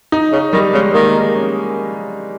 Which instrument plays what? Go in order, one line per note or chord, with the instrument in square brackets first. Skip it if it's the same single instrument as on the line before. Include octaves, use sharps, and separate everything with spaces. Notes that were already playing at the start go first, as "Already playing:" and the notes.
[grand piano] D#4
[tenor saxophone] C#3
[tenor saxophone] D#3 [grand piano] G3
[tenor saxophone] C#3 [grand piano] G#3
[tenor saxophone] D#3 [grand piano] A#3
[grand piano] C#4